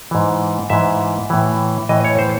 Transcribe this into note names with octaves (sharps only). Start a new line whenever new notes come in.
G#2 E3
G#2 E3 E5
A2 E3
A2 E3 D#5
C#5
C5